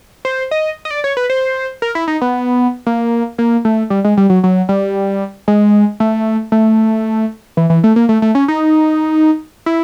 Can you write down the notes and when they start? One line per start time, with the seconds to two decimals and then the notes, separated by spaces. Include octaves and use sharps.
0.25 C5
0.51 D#5
0.85 D#5
0.91 D5
1.04 C#5
1.17 B4
1.30 C5
1.82 A#4
1.95 E4
2.08 D#4
2.21 B3
2.87 A#3
3.38 A#3
3.65 A3
3.90 G3
4.04 G#3
4.17 G3
4.30 F#3
4.44 F#3
4.69 G3
5.48 G#3
6.00 A3
6.52 A3
7.57 E3
7.70 E3
7.84 A3
7.96 A#3
8.09 A3
8.22 A3
8.35 C#4
8.48 D#4
9.66 E4